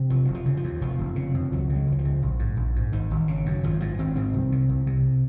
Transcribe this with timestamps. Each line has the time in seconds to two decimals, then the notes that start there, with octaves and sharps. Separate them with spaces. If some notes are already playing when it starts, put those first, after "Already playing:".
Already playing: C3
0.10 F1 F3
0.25 F1 F#3
0.34 F3
0.46 C#3
0.57 F3
0.64 D#2
0.81 F1 F3
0.99 F1
1.16 C#3
1.35 F2
1.52 C#2 F#3
1.69 C#3
1.75 G#3
1.87 C#2
1.92 F#3
1.99 F3
2.04 C#3
2.22 A#1
2.39 G#2
2.57 A#1
2.76 G#2
2.92 G#1 D#3
3.11 G#1
3.28 C#3
3.46 F#2
3.64 G#1 F3
3.80 G#2 F3
3.99 G#1 C4
4.16 G#2 C4
4.34 C2
4.52 C3
4.69 C2
4.87 C3